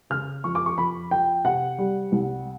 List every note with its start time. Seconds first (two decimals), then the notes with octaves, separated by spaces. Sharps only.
0.10 C#3 F6
0.44 F2 C#6
0.55 D6
0.66 C#6
0.78 F2 B5
1.11 F3 G5
1.45 C3 F#5
1.79 G3
2.12 C2